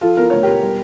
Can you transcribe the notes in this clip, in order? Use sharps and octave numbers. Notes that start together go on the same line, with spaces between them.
F3 F4 A4
E2 A#4
D2 C#5
E1 G4 A#4
G3